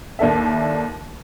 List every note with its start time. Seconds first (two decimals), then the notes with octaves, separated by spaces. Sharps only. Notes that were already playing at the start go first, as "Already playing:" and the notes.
0.19 D#2 A#3 D4 A4 E5